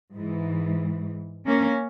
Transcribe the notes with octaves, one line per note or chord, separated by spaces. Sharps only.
G#2 E3
A#3 C#4